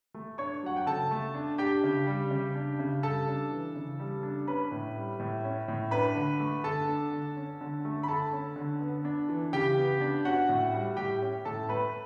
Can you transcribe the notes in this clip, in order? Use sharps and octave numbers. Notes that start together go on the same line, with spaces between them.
A3
D4 C#5 C#6
F#3 F#5
G5
C#3 A4 A5
A3
D4
D4 G4 G5
C#3
G3
C#3
D4
C#3
G3 A4 A5
D4
E3
C#3
G3
D4
C#4 B4 B5
A2
G3
A2
C#4
A2
D4 B4 B5
D3
A3
D3 A4 A5
D4
D3
C#4
D3
A3
B5
D3 A4 A5
C#4
D3
B3
D4
E3
C#3 G4 G5
B3
D4
C#4 F#4 F#5
A2
G3
A2 G4 G5
C#4
A2 A4 A5
A3 B4 B5